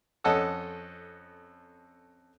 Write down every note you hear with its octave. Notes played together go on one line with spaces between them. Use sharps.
F2 C#4 A4 D#5 F#5 E6